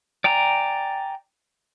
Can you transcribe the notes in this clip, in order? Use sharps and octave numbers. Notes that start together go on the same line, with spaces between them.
D5 G5 G#5 A#5